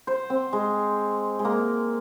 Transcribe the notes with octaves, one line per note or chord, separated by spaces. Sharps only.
C5
C4
G#3
G#3
A#3